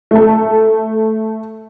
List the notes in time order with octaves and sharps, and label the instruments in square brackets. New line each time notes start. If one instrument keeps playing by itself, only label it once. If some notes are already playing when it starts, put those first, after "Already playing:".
[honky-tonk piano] A3 A4